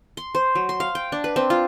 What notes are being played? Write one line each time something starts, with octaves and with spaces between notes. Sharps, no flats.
C6
C5
F#3
C6
F5
G5
D4
B4
C4
F4